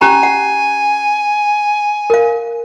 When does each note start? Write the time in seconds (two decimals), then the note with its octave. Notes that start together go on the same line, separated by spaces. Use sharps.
0.01 C#4 G4 G#5 A#5
0.23 F#5
2.10 A#4 F5